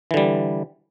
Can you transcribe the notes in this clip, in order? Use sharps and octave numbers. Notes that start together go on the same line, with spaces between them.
D3 E3 G3